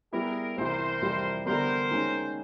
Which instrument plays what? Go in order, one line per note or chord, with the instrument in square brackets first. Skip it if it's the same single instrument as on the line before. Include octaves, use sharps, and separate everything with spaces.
[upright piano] G3 B3 E4 G4 [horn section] G#4 A#4
[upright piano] C2 C3 E3 [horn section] A#4 C5
[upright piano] F2 C3 E3 G3
[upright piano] D3 G3 B3 [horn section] A#4 C5
[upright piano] D#2 D#3 G#3 C#4